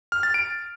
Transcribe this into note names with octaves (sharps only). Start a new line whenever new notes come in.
F6
A6
D7